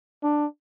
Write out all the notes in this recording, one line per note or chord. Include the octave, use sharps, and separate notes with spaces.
D4